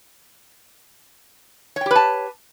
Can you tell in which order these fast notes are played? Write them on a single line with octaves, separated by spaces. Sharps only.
C#5 G5 G4 B4 A5